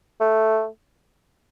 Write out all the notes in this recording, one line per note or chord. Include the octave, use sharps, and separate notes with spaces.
A3